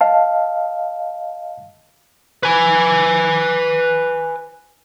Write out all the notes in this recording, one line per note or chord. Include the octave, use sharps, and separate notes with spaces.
D#5 F5 A5
B4 G#5